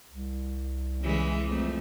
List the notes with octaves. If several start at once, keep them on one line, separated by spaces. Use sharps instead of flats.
C2
C#3 E3 G#3
F2 A3